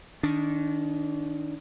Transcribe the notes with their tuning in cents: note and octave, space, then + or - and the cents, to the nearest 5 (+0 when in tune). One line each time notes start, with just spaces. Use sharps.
D#3 +0 D4 -30